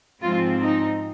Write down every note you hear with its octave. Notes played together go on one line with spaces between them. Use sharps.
G#2 F3 C4 F4
D#4